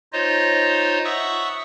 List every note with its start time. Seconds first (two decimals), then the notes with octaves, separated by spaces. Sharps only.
0.13 D#4 F4 C5 C#5 D#5
1.05 E5 F#5 C#6 D#6 E6 F#6